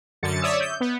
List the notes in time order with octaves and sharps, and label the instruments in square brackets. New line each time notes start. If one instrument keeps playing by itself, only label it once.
[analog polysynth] F#2 D3 A6 C#7
C#5 D5 E5 D#6 E6
G6
B3